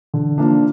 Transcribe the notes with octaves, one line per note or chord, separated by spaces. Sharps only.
D3
F3 A#3 D4